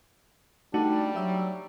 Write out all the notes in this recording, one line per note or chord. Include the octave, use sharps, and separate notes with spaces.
G3 A3 D4 D#4 F#4
F#3 G4 E5 E6